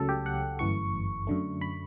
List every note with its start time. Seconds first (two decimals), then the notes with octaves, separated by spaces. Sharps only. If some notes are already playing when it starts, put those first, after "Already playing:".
Already playing: C#2 C#3 F#3 A3 A4
0.09 G4
0.26 F#5
0.59 G1 F#2 E3 A3 C#6
1.27 F#2 D3 A3
1.61 B5